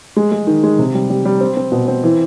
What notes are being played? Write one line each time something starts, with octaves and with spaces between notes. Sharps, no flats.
G#3
G#3
D#3
G#3
C3
G3
G3
G3
C4
C4
B2
C4
E3